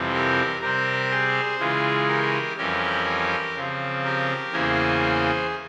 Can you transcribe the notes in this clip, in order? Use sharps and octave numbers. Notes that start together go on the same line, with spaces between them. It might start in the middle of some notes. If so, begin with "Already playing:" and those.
Already playing: F2 C3 E3 G3 C4
G4 A#4
C3 G3 C4 G4 A#4
G#4 C5
C#3 E3 G#3 F4 G#4
G4 A#4
F2 E3 G3 C#4 G4 A#4
C#3 F3 C4
G4 A#4
E2 C#3 E3 A#3 C#4 G#4 C5